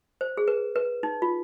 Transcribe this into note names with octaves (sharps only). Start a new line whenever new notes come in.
C5
G#4
B4
B4
D#4
F4